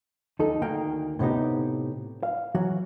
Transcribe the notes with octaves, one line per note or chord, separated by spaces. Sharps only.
D#2 D#4 A4
D2 D#3 A#3 G5
A2 C3 B3 D#4 G4
F5
E3 F#3 F#4